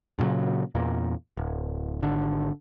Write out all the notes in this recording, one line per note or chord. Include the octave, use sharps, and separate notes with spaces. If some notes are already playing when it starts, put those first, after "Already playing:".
G2 A#2 C#3 F#3
E2 A#2 A#3
D1
G#1 D3